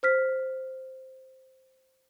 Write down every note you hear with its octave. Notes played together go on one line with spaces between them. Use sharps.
C5 F6 B6